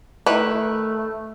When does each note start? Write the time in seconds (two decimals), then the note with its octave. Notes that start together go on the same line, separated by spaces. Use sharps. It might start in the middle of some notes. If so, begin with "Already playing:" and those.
0.26 D#3 A3 E4 B4